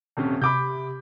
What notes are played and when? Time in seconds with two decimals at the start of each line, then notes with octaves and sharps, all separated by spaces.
0.17 D#1 C3 C#4
0.41 C3 B5 D6 G6